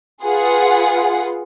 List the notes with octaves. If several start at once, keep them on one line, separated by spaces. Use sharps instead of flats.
F4 G#4 B4 F#5